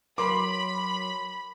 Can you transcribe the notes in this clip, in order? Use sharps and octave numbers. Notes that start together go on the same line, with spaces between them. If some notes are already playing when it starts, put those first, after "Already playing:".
F#3 A#4 B5 C6 D6